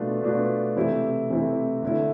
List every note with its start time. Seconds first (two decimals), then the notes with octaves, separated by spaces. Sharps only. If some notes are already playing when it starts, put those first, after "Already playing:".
Already playing: B2 A3 D4 F4 B4
0.22 B2 A3 D4 F4 B4
0.76 C3 E3 A3 C4 E4
1.30 C3 E3 A3 C4 E4
1.82 D3 A3 E4